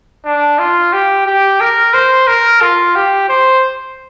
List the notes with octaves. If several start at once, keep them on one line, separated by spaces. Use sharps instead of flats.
D4
F4
G4
G4
A#4
C5
A#4
F4
G4
C5